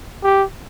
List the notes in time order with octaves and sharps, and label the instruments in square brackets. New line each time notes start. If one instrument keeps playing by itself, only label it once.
[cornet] G4